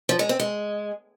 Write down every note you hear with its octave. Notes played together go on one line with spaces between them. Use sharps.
F3
G#3
C4
G#3